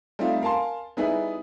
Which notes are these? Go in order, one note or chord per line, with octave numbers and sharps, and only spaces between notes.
G3 A3 C4 D#4 F4
A#4 F5 G#5 A5 C6
G3 B3 D#4 E4 G#4 B4